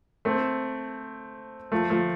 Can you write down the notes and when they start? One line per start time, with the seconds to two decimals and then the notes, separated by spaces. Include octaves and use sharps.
0.25 A3 C4
1.72 F3 A3
1.90 F3 A3